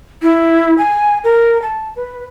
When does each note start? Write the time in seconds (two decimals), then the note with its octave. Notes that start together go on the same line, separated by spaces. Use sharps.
0.23 E4
0.78 G#5
1.24 A#4
1.62 A5
1.96 B4